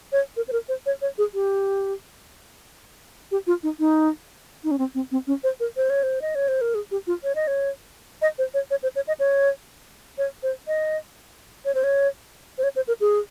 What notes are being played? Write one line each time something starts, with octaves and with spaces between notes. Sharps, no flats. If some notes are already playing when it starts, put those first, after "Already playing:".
C#5
A#4
C5
A#4
C5
C#5
C#5
G#4
G4
G4
F4
D#4
D#4
D#4
C#4
C4
C4
C4
C#4
C5
A#4
C5
C#5
C5
D#5
C#5
C5
A#4
G#4
G4
F4
C#5
D#5
C#5
D#5
C5
C#5
C#5
C5
C#5
D#5
C#5
C#5
C5
D#5
C#5
C5
C#5
C5
C#5
C5
A#4
G#4